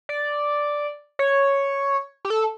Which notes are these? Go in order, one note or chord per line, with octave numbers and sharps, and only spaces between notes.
D5
C#5
G4
A4